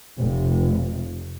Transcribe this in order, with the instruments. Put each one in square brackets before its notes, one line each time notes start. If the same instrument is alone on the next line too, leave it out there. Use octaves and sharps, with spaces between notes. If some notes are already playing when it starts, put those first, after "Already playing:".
[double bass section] F1 C3